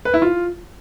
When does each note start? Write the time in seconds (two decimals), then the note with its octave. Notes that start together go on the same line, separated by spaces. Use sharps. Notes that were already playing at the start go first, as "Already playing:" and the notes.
0.05 B4
0.14 E4
0.22 F4